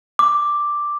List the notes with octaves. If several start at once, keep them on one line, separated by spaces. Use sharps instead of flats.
D6